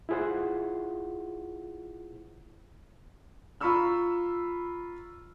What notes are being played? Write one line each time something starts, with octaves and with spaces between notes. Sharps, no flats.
E4 F4 G#4 C5 F#5
F4 A#5 B5 C#6 E6 F6